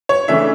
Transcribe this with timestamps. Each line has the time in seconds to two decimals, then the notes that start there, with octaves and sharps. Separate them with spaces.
0.09 C#5
0.28 C#3 E3 A3 D4 E5